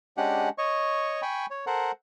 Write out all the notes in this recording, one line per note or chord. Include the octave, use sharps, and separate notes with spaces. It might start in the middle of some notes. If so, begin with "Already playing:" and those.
G#3 C#4 D4 G4 F#5
C#5 D#5 C#6
G5 G#5 B5 C#6
C#5
A4 A#4 C5 F#5